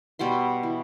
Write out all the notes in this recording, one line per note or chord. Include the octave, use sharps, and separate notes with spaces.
B2 G3 F#4 C6
E3